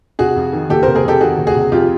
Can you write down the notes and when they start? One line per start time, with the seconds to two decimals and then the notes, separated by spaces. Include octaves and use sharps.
0.19 C3 F#4 G#4
0.36 F2
0.53 D#3
0.70 F#1 G4 A4
0.83 C3 A#4 C5
0.95 G#4 A#4
1.04 F2 G4 A4
1.21 D#3 F#4 G#4
1.38 F#1
1.47 F#4 G#4
1.55 C3
1.72 F2 F4 G4